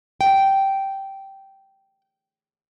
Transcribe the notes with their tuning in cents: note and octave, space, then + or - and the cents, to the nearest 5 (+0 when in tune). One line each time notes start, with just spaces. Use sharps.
G5 -10